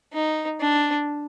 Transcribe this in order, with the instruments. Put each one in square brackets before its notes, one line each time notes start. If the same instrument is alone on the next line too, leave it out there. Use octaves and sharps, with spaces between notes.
[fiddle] D#4
D4